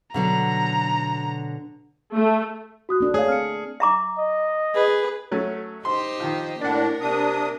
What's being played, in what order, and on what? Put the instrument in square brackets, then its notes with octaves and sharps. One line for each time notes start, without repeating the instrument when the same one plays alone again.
[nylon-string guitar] B2 D3 F#3 [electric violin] A#5
[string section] A3
[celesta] F#4 D#6 F#6
[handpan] A#3 D4 A4
[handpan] A3 [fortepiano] G#4 [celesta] C#5 F5
[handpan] C4 [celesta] F6 C#7
[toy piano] E5 A#5 D6
[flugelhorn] D#5
[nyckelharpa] G#4 B4
[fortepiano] F#3 A3 C#4
[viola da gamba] D#4 G4 C5 [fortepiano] C6
[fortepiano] D#3 F3
[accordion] A2 D4 [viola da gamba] A#3 A#4 [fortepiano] D5 F#5
[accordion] C3 D4 D#6